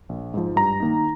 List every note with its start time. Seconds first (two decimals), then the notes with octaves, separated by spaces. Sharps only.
0.09 A#1
0.34 G#2 F3
0.56 G2 A#5
0.80 D#3 A#3 D#4